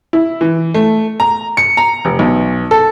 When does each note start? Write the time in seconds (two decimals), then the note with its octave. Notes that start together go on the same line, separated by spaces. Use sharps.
0.13 E4
0.41 E3
0.74 A3
1.20 A#5
1.57 C#7
1.77 A#5
2.05 F1
2.19 B1
2.71 A4